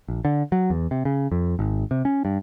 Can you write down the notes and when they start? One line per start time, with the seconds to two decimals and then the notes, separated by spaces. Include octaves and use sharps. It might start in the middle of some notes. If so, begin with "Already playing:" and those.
0.08 A#1
0.25 D3
0.52 F#3
0.70 E2
0.91 C3
1.05 C#3
1.32 F2
1.59 G#1
1.91 C3
2.05 C#4
2.25 G2